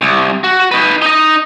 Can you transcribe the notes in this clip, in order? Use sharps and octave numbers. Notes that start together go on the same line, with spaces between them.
C2
F#4
D#4 B4
D#4 D#5